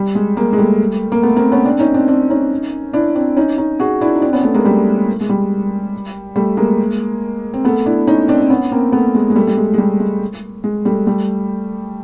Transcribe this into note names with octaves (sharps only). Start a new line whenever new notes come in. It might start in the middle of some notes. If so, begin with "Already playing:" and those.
Already playing: G3
G#3
G#3 A#3
G#3
G3 A3
A#3
A3 B3
A#3 C4
B3 C#4
C4 D4
C#4 D#4
C4 D4
C4 D4
C#4 D#4
D4 E4
C4 D4
C#4 D#4
C#4 D#4
F#4 G#4
D4 E4
D#4
C4 D4
B3 C#4
A3 B3
G#3 A#3
G3 A3
G#3
G3
G3 A3
G#3 A#3
C4
A3 B3
D4 E4
C#4 D#4
C4 D4
C4
B3 C#4
A#3 C4
A3 B3
G#3
G#3
G3 A3
G3
G#3
G#3
G3 A3
G#3
G#3
G3 A3
G3 A3